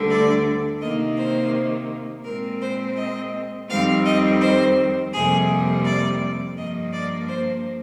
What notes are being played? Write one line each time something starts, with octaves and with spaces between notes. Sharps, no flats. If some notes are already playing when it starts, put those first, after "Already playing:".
Already playing: D2 D3 G3
D5
C3 D#3 A#3 D#5
C5
A#2 G#3 C4 A#4
C5
D#5
F2 D#3 G3 C4 F5
D#5
C5
F2 C3 G3 A#3 G#4
D5
G2 F3 A#3 D#5
D5
C5